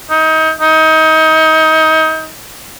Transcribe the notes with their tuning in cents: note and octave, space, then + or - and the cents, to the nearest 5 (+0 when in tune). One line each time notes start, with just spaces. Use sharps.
D#4 +30
D#4 +30